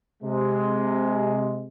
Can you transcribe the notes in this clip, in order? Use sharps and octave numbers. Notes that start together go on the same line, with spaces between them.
C3 G#3